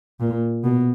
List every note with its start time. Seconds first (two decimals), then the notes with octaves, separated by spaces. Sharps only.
0.20 A#2
0.64 B2